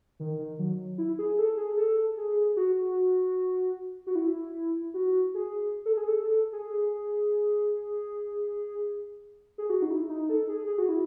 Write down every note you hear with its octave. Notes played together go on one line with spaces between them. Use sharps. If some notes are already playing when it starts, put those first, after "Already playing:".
D#3
D#3
F#3
E4
G#4
A4
G#4
A4
G#4
F#4
F#4
E4
F#4
G#4
A4
G#4
A4
G#4
G#4
F#4
D#4
E4
D#4
A4
G#4
G#4
F#4
E4